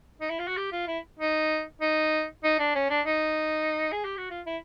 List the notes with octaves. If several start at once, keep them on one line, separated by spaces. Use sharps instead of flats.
D#4
E4
F4
F#4
G4
F4
E4
D#4
D#4
D#4
D4
C#4
D4
D#4
G#4
G4
F#4
F4
E4